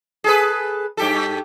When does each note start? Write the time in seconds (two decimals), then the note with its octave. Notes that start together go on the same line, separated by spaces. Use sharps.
0.24 G#4 A4 B4
0.97 G2 G4 A4